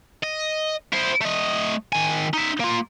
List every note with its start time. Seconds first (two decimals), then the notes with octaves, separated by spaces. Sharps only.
0.23 D#5
0.93 E4 C5
1.21 A3 D#5
1.93 D#3 G#5
2.34 D#4 E5
2.60 A#3 F4